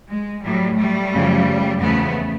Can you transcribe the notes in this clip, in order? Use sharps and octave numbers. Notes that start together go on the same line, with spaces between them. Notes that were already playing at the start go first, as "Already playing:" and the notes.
G#3
A2 F#3 G3
G3 A3
F#2 C#3 F3
E2 C#3 F3 A3 B3